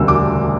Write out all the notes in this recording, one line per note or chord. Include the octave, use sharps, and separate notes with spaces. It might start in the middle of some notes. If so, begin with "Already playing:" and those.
Already playing: E1 D2 C#3 G3 E6
D6